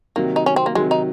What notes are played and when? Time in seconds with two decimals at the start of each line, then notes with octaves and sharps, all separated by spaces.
0.16 C3 D#3 F#3 A#3
0.36 D#4
0.46 C#4
0.56 C4
0.66 A#3
0.75 C3 D#3 F#3 G#3
0.91 D#4